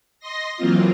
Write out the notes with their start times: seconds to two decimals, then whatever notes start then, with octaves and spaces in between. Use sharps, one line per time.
0.20 D#5 C6 A#6
0.57 E3 F#3 A#3 C4 F4